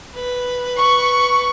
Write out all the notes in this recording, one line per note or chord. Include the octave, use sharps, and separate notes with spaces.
B4
C#6